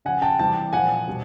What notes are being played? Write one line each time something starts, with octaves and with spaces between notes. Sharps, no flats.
C#3 F3 F#5 G#5
G5 A5
C3 E3 G3 G5 A5
A#2 F3 F#5 G#5
B2 G3